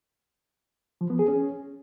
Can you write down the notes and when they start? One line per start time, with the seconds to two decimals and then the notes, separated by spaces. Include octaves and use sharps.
1.01 F3
1.10 B3
1.19 G#4
1.28 C#4